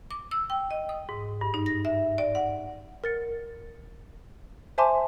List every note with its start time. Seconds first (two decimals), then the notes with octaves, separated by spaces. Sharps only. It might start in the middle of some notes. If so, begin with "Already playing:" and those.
0.11 D6
0.31 E6
0.50 G5
0.71 D#5
0.89 D#6
1.09 G#2
1.41 G2
1.54 D#4
1.66 A#6
1.85 E5
2.18 D5
2.35 F#5
3.04 A#4 A6 C#7
4.78 C5 E5 G#5 A5 C6 D6